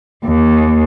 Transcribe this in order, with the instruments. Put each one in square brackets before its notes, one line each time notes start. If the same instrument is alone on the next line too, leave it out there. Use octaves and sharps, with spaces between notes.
[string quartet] D#2